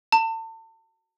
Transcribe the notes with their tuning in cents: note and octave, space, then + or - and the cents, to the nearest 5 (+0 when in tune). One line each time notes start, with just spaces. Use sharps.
A5 +40